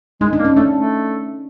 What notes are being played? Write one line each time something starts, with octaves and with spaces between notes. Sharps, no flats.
G#3 D#4
D4
A#3
C#4
A3 D4
A3